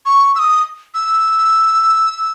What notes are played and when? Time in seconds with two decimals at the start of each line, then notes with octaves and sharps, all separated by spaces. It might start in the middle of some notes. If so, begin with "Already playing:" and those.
0.06 C#6
0.35 E6
0.39 D#6
0.94 E6